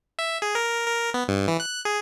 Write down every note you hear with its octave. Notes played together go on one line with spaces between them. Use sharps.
E5
G#4
A#4
A#4
B3
G2
E3
F#6
G#4